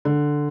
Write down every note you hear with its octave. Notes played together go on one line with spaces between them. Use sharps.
D3